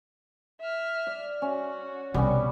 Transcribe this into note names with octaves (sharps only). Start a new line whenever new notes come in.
E5 F6
D5
C#4 F#4
B1 C3 G3 B3 C#4